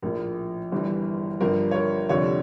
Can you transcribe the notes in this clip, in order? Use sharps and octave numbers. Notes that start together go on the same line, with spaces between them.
A#1 A2 F3 A#4
G1 G2 E3 G3
G1 G2 F3 A#4
C#5
A#4
F1 F2 D3 G3 C#5